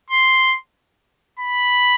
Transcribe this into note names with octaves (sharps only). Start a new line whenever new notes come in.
C6
B5